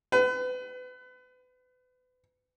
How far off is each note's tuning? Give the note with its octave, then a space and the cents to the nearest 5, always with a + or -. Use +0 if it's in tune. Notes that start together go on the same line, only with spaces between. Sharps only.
B4 +35